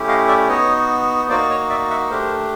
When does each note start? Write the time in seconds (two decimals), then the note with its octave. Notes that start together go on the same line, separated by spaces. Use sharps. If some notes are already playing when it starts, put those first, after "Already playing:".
Already playing: A3 C#4 E4 G4
0.08 D#5 F5
0.28 D5 E5
0.48 B3 D#4 F#4 C#5 D#5
1.29 A#3 D#4 F#4 C5 D5
1.50 C#5 D#5
1.70 D5 E5
1.90 E5 F#5
2.10 A3 D4 G4 A#4 C5